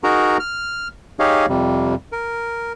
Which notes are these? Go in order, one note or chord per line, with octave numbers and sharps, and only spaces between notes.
D#4 F#4 G#4 A#4 A#5
F6
D#4 G4 G#4 C#5 D#5 F5
F2 C3 G3
A#4